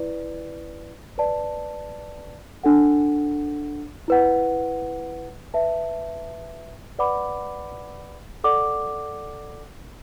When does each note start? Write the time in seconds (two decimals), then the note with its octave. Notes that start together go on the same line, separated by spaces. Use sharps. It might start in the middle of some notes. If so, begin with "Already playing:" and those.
Already playing: E4 B4 D5
1.18 B4 D5 A5
2.63 D4 A4 F#5
4.08 E4 B4 F#5
5.54 B4 E5 A5
6.99 B4 D5 F#5 B5 D6
8.44 A4 D5 F#5 D6